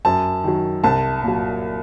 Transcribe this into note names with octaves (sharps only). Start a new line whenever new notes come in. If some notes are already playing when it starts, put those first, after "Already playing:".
F#2 A5
D#3 F#3
C2 A5
A#2
F#3